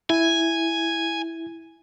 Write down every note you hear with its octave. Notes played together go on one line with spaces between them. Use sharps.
E4 G#5